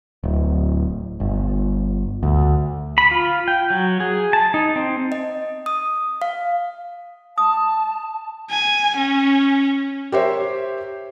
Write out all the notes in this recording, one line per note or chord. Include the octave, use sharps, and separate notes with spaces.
D1
G1
D2
B5
F4
G5
F#3
G#4
A5
D#4
C4
D#5
D#6
F5
A5 D#6
G#5
C#4
G4 A#4 C5 C#5 E5